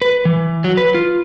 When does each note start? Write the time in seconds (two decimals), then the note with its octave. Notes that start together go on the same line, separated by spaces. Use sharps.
0.02 B4
0.25 E3
0.64 F#3
0.77 B4
0.95 F4